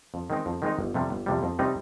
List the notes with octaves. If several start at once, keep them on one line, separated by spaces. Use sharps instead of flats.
F2
D#3 G#3 C4 D#4
F2
D#3 G#3 C4 D#4
G1
F2 C3 G3
G1
F2 C3 G3
F2
C3 G3 C4 D#4